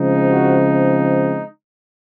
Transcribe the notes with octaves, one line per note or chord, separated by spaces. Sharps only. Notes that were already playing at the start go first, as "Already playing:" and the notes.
Already playing: C#3 F3 G#3 C4 D#4
F#4